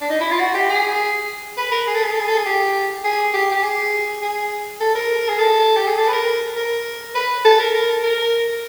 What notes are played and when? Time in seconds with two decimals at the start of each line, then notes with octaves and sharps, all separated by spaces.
0.01 D4
0.10 D#4
0.20 E4
0.31 F4
0.40 F#4
0.54 G4
0.69 G#4
1.57 B4
1.72 A#4
1.87 G#4
1.95 A4
2.03 G#4
2.11 A4
2.20 G#4
2.28 A4
2.37 G#4
2.46 G4
3.04 G#4
3.34 G4
3.51 G4
3.63 G#4
4.22 G#4
4.81 A4
4.95 A#4
5.28 G#4
5.39 A4
5.77 G4
5.87 G#4
5.98 A4
6.08 B4
6.13 A#4
6.56 A#4
7.15 B4
7.45 A4
7.60 A#4
7.74 A#4
8.03 A#4